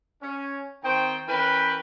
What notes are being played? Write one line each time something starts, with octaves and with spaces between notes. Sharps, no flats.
C#4
D#3 C4 C5 G5
E3 C#4 A#4 B4 G5